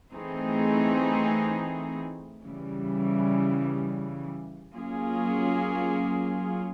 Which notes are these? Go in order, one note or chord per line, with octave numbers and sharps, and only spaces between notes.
E3 A3 C4 D#4 G#4
C#3 E3 G3
F#3 A#3 C#4 F4 G#4